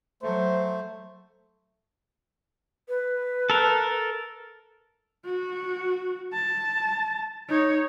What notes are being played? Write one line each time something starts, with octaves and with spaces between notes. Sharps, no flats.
F#3 A3 C5
B4
A4 A#4
F#4
A5
D#4 C#5